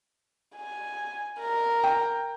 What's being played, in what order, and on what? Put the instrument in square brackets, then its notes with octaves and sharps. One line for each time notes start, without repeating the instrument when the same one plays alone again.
[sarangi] G#5
A#4
[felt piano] G5